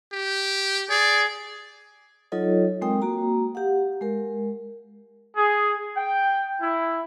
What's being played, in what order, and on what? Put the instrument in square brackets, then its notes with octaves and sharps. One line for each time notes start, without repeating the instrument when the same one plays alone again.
[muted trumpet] G4
[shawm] G#4 [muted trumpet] D5
[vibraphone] F#3 D#4 F4 A4 C#5 D#5
G#3 C4 A#4 G5 D#6
A#3 F#4 A#5
G4 F5 F#5
G#3 A#4
[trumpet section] G#4
G5
E4